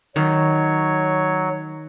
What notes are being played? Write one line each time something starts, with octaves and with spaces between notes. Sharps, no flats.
D#3 F#3 C#5